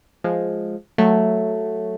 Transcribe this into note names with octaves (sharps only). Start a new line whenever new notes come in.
F3 G#3
F#3 A3